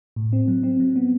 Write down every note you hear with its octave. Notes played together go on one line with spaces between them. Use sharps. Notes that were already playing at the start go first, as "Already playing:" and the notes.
A2
C4
F#3
C4
F#3
B3